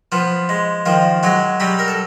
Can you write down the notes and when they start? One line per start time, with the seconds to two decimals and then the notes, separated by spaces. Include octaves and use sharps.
0.12 F3 B3 F4
0.49 G#3
0.86 D#3 F3 F4
1.23 F#3 G#3 F#4
1.60 F#3 G3 G4
1.79 A#4
1.88 A4